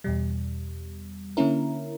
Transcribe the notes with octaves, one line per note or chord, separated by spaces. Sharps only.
E2 B2 G3
D3 A#3 C#4 E4 A#4